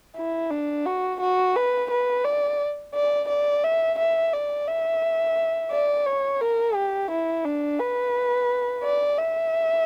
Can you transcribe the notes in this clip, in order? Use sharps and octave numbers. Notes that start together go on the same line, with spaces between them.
E4
D4
F#4
F#4
B4
B4
D5
D5
D5
E5
E5
D5
E5
D5
C#5
A#4
G4
E4
D4
B4
D5
E5